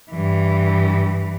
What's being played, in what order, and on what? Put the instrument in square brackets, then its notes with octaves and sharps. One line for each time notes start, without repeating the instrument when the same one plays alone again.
[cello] G2 E3